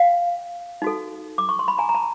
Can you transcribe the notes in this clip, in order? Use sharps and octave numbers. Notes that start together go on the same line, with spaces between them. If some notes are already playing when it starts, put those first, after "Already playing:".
Already playing: F5 G5
D#4 F#4 A4
D6
C#6
C6
B5
G#5 A#5
A#5
A5 B5